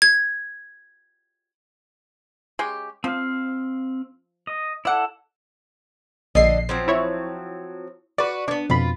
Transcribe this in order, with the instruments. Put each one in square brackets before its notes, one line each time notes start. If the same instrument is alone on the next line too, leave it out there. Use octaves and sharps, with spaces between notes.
[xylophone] G#6
[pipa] G#3 C#4 G4
[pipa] F3 [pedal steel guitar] C4 F5
[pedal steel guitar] D#5
[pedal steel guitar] E4 A4 [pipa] D5 F#5
[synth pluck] A#1 C7 [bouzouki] D3 D#5
[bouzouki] F3 F#3 C4
[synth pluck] E4 C#5
[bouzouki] F#4 B4 [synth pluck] D5
[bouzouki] A#3 B3 [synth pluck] D4
[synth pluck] F2 B2 B5 [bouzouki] F4